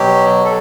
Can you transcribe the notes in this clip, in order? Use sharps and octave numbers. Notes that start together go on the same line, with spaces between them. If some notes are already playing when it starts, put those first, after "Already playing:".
Already playing: B2 F#3 G4
A4